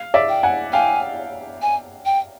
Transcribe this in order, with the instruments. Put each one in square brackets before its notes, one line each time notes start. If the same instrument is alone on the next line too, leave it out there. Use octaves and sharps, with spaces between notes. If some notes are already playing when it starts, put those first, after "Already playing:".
Already playing: [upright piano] F5
D5 E5
[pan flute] G5
[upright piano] F#5 G#5
[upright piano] F5 G5 [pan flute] G#5
[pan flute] G#5
G5